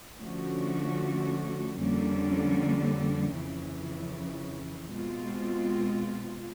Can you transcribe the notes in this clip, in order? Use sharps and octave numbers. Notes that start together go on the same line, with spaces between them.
D3 F3 A3 C#4 F#4
F2 D3 G3 A#3 C#4
F2 C#3 E3
B2 G#3 C4 F4